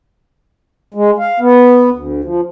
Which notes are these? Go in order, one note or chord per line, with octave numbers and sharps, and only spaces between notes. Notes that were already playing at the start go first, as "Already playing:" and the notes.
G#3
F5
B3
D2
F3